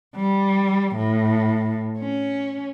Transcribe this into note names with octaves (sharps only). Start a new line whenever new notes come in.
G3
A2
C#4